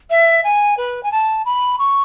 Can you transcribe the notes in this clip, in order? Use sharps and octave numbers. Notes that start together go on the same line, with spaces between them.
E5
G#5
B4
G#5
A5
B5
C#6